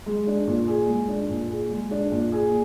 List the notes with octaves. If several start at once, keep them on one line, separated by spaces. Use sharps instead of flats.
G#3
D4
A#2
G#4
G#3
D4
A#2
G#4
G#3
D4
A#2
G#4